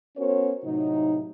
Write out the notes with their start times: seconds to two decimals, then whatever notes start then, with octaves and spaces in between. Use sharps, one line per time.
0.17 B3 C#4 F#4 A#4 C5 C#5
0.64 A2 C3 F#3 D#4